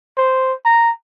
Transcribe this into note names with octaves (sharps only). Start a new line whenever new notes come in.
C5
A#5